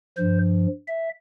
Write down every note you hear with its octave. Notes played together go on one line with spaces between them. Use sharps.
G2 F3 C5
E5